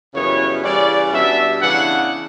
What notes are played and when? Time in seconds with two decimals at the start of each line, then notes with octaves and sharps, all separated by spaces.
0.13 F#2 C#3 E3 G3 B3 C#5
0.63 C#3 E3 G3 C#4 D5
1.12 B2 G3 D4 E5
1.61 C#3 E3 B3 D4 F#5